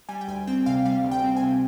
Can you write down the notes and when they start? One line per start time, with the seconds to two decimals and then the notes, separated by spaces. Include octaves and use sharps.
0.09 G3 G#5
0.21 G5
0.28 D2 G#5
0.47 C4 G5
0.66 C3 F5
0.85 G3 F5
1.04 D2
1.11 G5
1.24 C4
1.36 G#5
1.43 C3